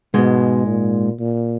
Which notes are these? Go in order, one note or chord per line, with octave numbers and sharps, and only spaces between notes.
G#2 B2 G#3
A#2
A#2